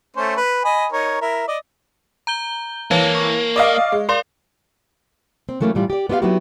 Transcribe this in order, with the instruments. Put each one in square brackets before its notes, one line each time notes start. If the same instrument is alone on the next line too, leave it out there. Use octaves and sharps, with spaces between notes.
[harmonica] A3 C#4 C5
B4
D#5 G#5 B5
D#4 A#4 C#5
E4 A#4 E5
D5 D#5
[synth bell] A#5 G6 G7
[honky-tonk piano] E3 [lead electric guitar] A#3 [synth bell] C#5 F5 A5
[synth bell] C#6
[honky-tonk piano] D5 D#5 F5
G#3
[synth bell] A#4 D5 F5 [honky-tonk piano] C6
[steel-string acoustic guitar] C4
E3 F#3 A3 A#3 C#4
A2 E3 G3 F4
G4 D5
B3 F4 G4 E5 F5
F#3 B3 D#4 E4 F#4 G4